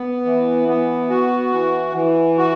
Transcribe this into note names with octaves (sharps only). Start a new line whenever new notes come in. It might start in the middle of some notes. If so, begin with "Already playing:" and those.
Already playing: B3
E3
B3
F#4
E3
E3
F#4